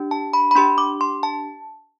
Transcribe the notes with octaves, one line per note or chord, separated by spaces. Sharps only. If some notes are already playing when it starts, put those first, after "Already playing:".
Already playing: D4 G4
A5
B5
B5
D4 G4 C6
D6
C6
A5